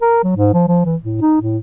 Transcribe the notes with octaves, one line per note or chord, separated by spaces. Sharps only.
A#4
F#3
G#2
F3
F3
E3
A2
D#4
A2